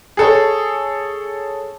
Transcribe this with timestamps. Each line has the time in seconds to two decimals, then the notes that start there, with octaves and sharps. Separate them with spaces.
0.17 G#4 A4 C#5